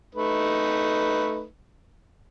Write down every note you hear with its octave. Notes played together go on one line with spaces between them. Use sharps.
A3 D#4 B4